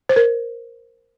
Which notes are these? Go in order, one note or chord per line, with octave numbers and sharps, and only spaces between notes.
C5
A#4